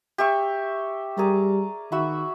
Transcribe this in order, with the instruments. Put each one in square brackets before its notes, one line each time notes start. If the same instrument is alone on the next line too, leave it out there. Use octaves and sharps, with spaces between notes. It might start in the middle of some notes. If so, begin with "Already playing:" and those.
[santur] G4 E5 C#6
[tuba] G3 [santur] G#4 A#4 D5
[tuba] D#3 [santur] F#4 E5 B5